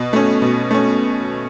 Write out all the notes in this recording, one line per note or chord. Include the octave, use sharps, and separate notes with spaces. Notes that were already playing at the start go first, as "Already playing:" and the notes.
Already playing: B2
A3 C#4
B2
A3 C#4